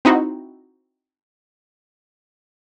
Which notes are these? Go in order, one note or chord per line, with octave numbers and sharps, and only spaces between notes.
C4 D#4 E4 F#4